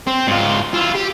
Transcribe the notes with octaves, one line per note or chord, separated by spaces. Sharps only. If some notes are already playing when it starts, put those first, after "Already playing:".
C4
G#2 F4
E4 F4
G4